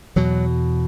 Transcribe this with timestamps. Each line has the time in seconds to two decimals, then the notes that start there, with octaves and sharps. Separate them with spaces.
0.16 E2 B2 F#3